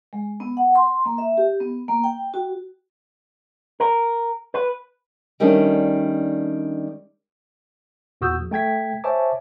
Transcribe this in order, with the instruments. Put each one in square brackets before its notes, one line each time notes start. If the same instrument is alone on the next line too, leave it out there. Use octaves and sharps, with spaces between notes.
[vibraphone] G#3
B3
F#5
C6
A#3
E5
G4
B3
A#3
G5
F#4
[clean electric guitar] A#4
B4
[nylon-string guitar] D#3 G3 A3 C#4 D4
[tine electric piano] E2 A#2 F#4 D#6 E6 G6
A#1
A3 G5 G#6 B6
C5 C#5 E5 G#5 A5 D6